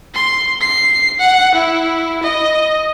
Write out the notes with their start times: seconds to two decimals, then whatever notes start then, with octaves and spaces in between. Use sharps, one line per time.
0.14 C6
0.61 C7
1.20 F#5
1.55 E4
2.22 D#5